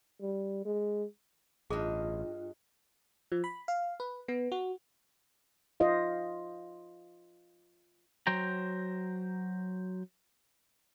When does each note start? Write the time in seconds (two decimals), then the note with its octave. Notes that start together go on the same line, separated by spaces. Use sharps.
0.22 G3
0.65 G#3
1.70 A1 G2 F4 G#4 D#5
3.32 F3
3.44 B5
3.68 F5
4.00 B4
4.28 B3
4.52 F#4
5.80 F4 C5 D#5 F5
8.27 F#3 C5 G5 A#5